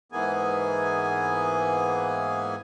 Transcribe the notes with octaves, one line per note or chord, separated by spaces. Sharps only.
G#2 E3 A#3 B3 G#4 G#5